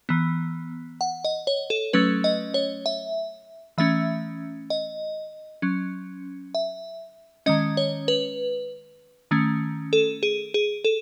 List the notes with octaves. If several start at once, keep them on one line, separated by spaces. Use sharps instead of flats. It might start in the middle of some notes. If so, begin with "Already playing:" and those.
E3 B3
F#5
D#5
C#5
A4
F#3 A3 C#4 B4
D#5
C#5
E5
E3 A3 C#4 E5
D#5
F#3 C#4
E5
D#3 G#3 C#4 D#5
C#5
B4
D#3 A3 C#4
A4
G#4
G#4
A4